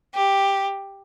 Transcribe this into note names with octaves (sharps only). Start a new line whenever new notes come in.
G4